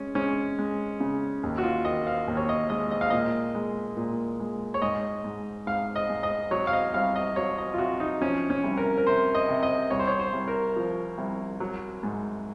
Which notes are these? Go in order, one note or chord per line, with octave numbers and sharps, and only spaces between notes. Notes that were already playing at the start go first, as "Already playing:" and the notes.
Already playing: G#3 C#4
G#3 C#4
G#3
C#3
D#2
F#4
F4
D#3 D#5
F5
D#2
C#5
D#5
G#3 D#5
D#5
F5
A#2 D#5
G#3
A#2
G#3
C#5
G#2 D#5
G#2
G#2 F5
D#5
G#2
D#5
F#3 C#5
F5
D#5
C2 F5
D#5
F#3 C#5
D#5
F4
C3 F#4
D#4
F3 C#4
C#4
C2
A#4
A#4
C3 C5
D#5
C3
D#5
C2 C#5
C5
C#5
C5
C2
A#4
F3
C2
F#3
G#2